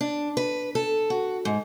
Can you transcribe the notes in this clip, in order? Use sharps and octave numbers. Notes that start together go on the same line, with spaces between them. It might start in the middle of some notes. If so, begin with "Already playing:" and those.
D4
B4
A4
F#4
G#2